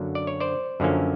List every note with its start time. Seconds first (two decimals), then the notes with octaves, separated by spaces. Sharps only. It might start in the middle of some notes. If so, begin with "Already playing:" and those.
Already playing: F#2 D3 F#3 A#3
0.15 D5
0.27 C#5
0.40 C5 D5
0.80 F#2 D3 F3 A#3 C#4